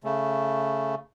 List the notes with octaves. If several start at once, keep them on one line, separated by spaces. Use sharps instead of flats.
C#3 A3